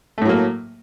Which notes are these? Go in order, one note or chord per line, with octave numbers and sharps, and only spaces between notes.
A2 F#3 A3 A#3